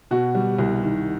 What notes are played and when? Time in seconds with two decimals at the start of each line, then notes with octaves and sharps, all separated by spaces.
0.11 B2 F#4
0.35 G3
0.59 C2
0.83 D#3